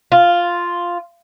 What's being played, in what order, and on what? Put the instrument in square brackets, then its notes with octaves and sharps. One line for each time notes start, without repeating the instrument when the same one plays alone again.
[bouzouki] F4